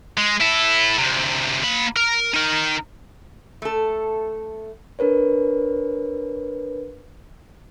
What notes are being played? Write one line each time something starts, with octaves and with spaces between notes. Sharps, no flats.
G#3
E4 A4
D2 C3
A#3 B5
A#4
D#4 A#4
A3 A4
D4 A#4 B4 C#5